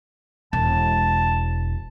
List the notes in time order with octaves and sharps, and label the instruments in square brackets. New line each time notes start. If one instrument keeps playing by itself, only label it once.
[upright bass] E1 [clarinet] A5